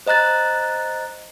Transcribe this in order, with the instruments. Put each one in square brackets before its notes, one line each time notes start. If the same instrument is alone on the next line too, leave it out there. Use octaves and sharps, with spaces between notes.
[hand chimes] C5 D#5 A#5 F#6 A6